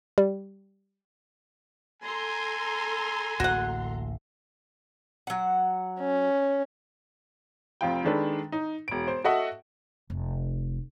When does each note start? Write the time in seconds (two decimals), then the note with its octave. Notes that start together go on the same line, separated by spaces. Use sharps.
0.18 G3
2.02 A4 G#5 A#5 C6
3.40 D1 A1 A#3 F#4 F#5
5.27 F#3 F#5
6.00 C#4
7.81 F1 F2 F4 G5
8.04 D#3 G#3 D4 A4 B4
8.52 D#4
8.88 E1 D7
9.08 C5
9.24 F#4 A4 D#5 E5 F#5
10.10 F1